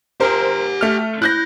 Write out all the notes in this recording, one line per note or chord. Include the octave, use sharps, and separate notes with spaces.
G4 A#4 C5 G#5
A3 F6
E4 F#6 G6 A#6